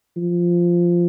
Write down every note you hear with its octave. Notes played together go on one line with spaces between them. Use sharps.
F3